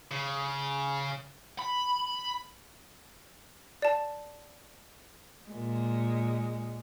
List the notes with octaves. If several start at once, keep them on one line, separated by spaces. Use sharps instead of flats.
C#3
B5
D5 A5
A#2 G#3